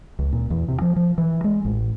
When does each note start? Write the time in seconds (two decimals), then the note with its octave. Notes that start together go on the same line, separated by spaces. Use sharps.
0.19 C#2
0.33 A#2
0.50 E2
0.68 C3
0.82 F3
0.96 F3
1.18 E3
1.44 G#3
1.65 A1